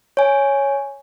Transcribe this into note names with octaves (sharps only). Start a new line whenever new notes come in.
C#5 G#5